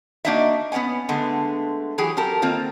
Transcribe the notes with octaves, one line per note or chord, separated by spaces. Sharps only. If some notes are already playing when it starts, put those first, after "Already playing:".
A#3 D4 D#4 F#4 D#5 E5
B3 C#4 D5 F#5 G#5
D3 G#3 A3 B3
E3 F#3 G4 G#4
F#3 G4 A4 A#4
D#3 A#3 C4 F4